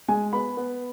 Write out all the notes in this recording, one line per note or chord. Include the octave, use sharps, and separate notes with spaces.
G#3 G#5
B3 B5
B3